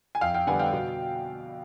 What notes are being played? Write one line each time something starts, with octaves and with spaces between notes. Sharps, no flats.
G#5
F2 F5 G5
F5 G5
D3 G3 B3 F#5 G#5
F5 G5
B2